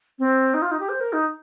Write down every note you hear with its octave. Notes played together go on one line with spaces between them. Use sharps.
C4
D#4
F4
D#4
G4
C5
A#4
D#4